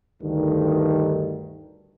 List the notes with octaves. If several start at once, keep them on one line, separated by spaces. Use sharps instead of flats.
D2 G2 D3 D#3